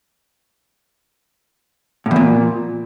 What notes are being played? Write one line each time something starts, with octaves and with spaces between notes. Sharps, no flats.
A2
E2
A#2